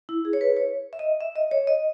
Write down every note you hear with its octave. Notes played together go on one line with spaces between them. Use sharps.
E4
G#4
C#5
B4
C#5
E5
D#5
E5
D#5
C#5
D#5